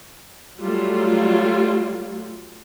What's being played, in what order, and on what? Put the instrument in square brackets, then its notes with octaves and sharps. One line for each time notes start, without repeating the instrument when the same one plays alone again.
[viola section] F#3 G3 A3 F4